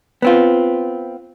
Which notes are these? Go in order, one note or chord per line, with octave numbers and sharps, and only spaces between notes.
B3 C4 F4